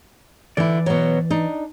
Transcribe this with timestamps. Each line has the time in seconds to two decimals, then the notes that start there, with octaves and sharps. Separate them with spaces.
0.57 D3 E3 E4 D5
0.86 B2 F#3
1.30 D4 D#4